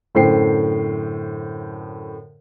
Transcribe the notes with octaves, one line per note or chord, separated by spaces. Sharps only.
F#2 A2 D3 C5 G5 C7